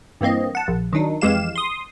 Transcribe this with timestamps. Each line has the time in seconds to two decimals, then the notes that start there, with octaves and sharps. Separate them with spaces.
0.21 G2 E3 A#3 C4 D#5
0.55 F#5 A5
0.68 A#1
0.93 D#3 F#3 D4 D#4
1.21 F2 E3 G#3 G4 F5 E7
1.56 C6 D#6